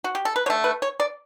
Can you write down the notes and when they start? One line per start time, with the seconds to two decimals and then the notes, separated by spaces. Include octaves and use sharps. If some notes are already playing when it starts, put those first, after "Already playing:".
0.04 F#4
0.15 G4
0.25 A4
0.36 B4
0.46 D3 C#5
0.50 A3
0.64 B4
0.82 C#5
1.00 D5